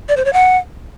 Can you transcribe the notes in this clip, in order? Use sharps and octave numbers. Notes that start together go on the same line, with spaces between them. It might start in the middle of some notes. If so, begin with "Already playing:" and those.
D5
C5
C#5
F#5